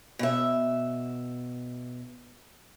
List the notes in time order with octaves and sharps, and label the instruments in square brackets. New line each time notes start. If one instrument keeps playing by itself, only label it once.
[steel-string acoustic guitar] B2 E5